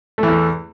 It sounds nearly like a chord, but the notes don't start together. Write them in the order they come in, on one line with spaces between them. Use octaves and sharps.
A3 E3 E2